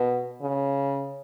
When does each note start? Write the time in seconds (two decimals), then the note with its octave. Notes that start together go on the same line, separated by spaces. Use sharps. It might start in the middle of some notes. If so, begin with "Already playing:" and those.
Already playing: B2
0.42 C#3